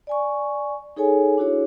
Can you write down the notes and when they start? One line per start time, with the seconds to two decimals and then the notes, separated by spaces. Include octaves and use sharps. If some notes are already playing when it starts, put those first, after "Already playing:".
0.07 D5 G#5 C#6
0.96 D#4 G#4 A4 C#5 G#5
1.38 D4 E4 F#4 G#4 C#5